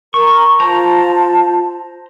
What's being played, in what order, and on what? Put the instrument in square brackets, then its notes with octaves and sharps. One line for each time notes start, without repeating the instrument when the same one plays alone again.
[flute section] A#4 [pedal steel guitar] C#6
[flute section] F4 A5 [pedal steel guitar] C5 A#5